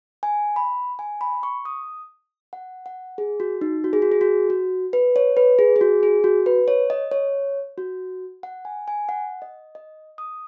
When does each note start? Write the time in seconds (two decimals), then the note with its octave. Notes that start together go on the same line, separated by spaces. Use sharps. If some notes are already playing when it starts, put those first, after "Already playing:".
0.23 G#5
0.56 B5
0.99 G#5
1.21 B5
1.43 C#6
1.65 D#6
2.53 F#5
2.86 F#5
3.18 G#4
3.40 F#4
3.61 D#4
3.84 F#4
3.93 G#4
4.02 F#4
4.12 G#4
4.21 F#4
4.50 F#4
4.93 B4
5.16 C#5
5.37 B4
5.59 G#4
5.76 G#4
5.81 F#4
6.03 G#4
6.24 F#4
6.46 B4
6.68 C#5
6.90 D#5
7.11 C#5
7.78 F#4
8.43 F#5
8.65 G#5
8.88 G#5
9.09 F#5
9.42 D#5
9.75 D#5
10.18 D#6